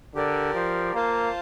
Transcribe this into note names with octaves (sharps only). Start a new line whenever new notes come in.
D3 G4 A#4 D5
F3
A#3 F4 C5 F5 A5